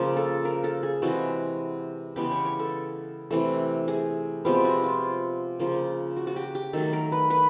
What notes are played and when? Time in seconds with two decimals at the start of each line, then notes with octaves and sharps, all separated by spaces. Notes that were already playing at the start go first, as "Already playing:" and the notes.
Already playing: C#3 F3 A#3
0.17 A4
0.45 A#4
0.64 A4
0.83 G#4
1.02 C3 E3 G#3 F#4
2.16 C#3 E3 G#3 B3 G4
2.31 C#5
2.45 C#5
2.59 A4
3.31 C3 E3 A3
3.88 G#4
4.45 C3 F3 G#3 B3 G4
4.64 F#4
4.83 F4
5.59 C#3 F3 A#3
6.16 F#4
6.27 F#4
6.36 G4
6.55 G4
6.73 D#3 F#3 A3 A4
6.93 A#4
7.12 B4
7.30 B4